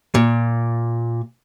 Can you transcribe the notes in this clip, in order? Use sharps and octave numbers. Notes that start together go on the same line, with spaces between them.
A#2